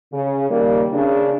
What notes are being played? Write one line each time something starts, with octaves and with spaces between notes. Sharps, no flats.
C#3
D#2 G3 A#3
C#3 D4